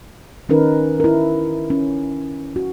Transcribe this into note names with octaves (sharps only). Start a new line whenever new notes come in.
D#3 C#4 D#4 A#4 B4
E4 A#4
C#4
F#4